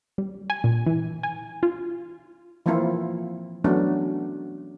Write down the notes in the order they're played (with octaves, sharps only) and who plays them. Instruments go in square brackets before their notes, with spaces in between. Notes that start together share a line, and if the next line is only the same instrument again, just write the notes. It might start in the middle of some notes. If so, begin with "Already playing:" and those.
[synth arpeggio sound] G3
G#5
A#2
E3
G#5
F4
[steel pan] E3 F3 A#3 C4 E4 F4
E3 F#3 A3 B3 C#4 D4